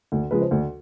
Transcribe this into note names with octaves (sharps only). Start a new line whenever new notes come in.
D2
C#3 F3 G#3 B4
C5
D2